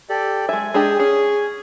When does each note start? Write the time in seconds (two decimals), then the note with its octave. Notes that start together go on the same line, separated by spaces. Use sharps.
0.09 G4 A4 D5
0.49 G#3 E5 G#5
0.74 G#3 D4 G4 G#4
0.99 C#4 G#4